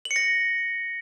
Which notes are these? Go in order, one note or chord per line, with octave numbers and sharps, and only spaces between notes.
F#7
C#7
A#6